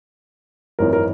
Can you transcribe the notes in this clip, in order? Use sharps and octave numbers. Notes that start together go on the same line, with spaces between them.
G#1 F#2 E3 A#4
A#4